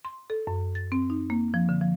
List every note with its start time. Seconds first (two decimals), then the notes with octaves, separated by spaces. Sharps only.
0.05 C6
0.30 A4
0.47 F#2
0.75 A6
0.92 C4
1.10 D#4
1.30 A#3
1.54 F3
1.69 D3
1.81 F3